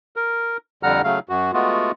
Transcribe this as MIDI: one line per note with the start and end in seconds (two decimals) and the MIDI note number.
0.16 0.57 70
0.83 1.02 41
0.83 1.02 50
0.83 1.02 55
0.83 1.02 78
0.83 1.02 82
0.83 1.02 89
1.04 1.19 49
1.04 1.19 54
1.04 1.19 57
1.04 1.19 77
1.29 1.51 42
1.29 1.51 66
1.54 1.91 56
1.54 1.91 57
1.54 1.91 59
1.54 1.91 65
1.54 1.91 66